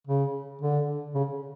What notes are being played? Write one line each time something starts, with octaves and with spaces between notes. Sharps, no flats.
C#3
D3
C#3